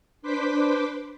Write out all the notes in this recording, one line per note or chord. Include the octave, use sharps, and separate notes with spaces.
D4 B4 C5 C6 D6 B6